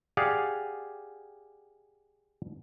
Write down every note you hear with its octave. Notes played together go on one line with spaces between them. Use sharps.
G4 G#4 D5 F5 F#5